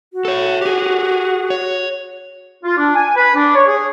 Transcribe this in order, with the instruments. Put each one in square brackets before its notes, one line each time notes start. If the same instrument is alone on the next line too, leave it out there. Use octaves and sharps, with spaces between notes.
[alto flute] F#4
[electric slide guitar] A4 C#5
G4 G#4
C#5
[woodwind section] F4
D4
G#5
B4
D4
C#5
G#4